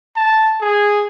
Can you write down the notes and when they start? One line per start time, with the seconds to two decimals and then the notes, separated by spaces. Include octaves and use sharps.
0.16 A5
0.62 G#4